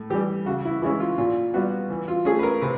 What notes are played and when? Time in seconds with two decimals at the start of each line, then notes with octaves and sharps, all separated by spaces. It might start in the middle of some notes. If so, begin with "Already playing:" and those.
Already playing: A2
0.10 E3 G3 G4
0.46 C#3 F#4
0.65 E4
0.82 E3 G#3 C#4 E4
1.00 F4
1.18 A#2 F4
1.54 G3 B3 F#4
1.90 E3
2.08 F4
2.25 A3 C#4 G#4
2.39 B4
2.43 A#4
2.62 C3 B4